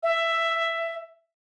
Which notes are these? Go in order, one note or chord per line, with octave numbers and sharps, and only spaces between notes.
E5